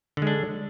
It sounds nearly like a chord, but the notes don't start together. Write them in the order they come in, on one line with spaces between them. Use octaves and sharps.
D3 G#3 D4